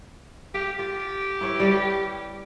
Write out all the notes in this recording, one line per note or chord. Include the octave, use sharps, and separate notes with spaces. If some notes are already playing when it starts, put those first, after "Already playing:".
G4 F5
F4 G4
E4 B4 C#5
G3 B4 C#5